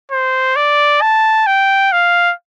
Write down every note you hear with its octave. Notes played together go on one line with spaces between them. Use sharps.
C5
D5
A5
G5
F5